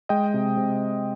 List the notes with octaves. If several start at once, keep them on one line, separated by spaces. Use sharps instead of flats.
G#3 D#5 G5
C3
C3